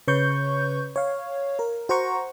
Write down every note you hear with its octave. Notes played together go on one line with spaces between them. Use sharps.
C#3 B4 C#5 C#6 G6
C#5 F5
A#4
F#4 C5 F#5 A#5 C#6